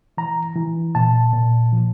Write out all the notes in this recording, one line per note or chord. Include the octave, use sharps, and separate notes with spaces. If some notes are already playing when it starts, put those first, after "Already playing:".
E3 A#5
E3
A#2 A5
A#2
F3